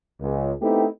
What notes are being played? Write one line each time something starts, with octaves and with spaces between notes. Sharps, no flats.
C#2
A3 B3 C4 D#4 E4 G4